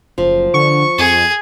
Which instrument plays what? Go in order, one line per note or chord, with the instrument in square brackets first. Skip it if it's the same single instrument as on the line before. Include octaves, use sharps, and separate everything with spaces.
[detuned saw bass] F#1 [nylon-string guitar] F3
[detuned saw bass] D3 [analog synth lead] C#6
[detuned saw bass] F2 [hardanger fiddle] G#4